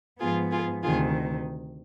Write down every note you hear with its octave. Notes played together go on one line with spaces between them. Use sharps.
G#2 F3 B3 F4 G#4
F4 G#4
D2 C3 D#3 F4 G#4